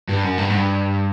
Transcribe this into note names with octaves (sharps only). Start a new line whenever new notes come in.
G2
F#2
G2
G#2
G2